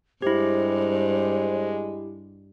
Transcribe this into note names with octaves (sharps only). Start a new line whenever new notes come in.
G2 G#3 E4 G4 C5